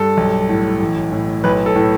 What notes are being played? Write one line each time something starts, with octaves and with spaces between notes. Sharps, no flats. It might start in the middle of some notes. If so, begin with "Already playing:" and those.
Already playing: G2 A4
B1
A2
A1
A2
B1 B4
A4
A2